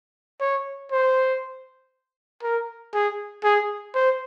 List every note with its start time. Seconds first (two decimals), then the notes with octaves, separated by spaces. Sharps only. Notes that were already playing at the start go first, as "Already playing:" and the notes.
0.41 C#5
0.92 C5
2.43 A#4
2.94 G#4
3.44 G#4
3.95 C5